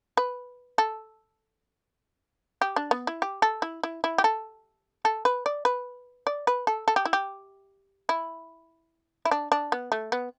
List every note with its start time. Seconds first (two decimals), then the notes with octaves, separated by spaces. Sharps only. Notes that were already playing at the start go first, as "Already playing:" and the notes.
0.17 B4
0.78 A4
2.61 G4
2.76 D4
2.91 B3
3.07 E4
3.22 G4
3.42 A4
3.62 E4
3.83 E4
4.04 E4
4.18 G4
4.24 A4
5.05 A4
5.25 B4
5.46 D5
5.65 B4
6.27 D5
6.47 B4
6.67 A4
6.88 A4
6.96 G4
7.05 E4
7.13 G4
8.09 E4
9.25 E4
9.31 D4
9.52 D4
9.72 B3
9.92 A3
10.12 B3